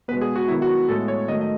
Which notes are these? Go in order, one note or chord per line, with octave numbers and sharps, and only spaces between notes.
B2 G#3 B3 B4
G#4
F#4
D#3 F#3 B3 E4
F#4
A2 G#3 B3 A4
C#5
D#3 F#3 A3 D#5
D#5